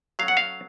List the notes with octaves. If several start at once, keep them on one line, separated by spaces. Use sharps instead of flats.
F#3 A3 C#4 F5
F#5
F5